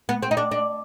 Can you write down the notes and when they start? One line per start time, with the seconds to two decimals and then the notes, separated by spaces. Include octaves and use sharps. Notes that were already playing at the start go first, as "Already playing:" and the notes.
0.09 B3
0.23 C4
0.31 D#4
0.37 D4
0.52 D4